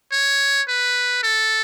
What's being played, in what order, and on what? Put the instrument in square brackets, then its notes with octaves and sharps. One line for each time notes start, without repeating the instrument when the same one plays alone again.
[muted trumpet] C#5
B4
A4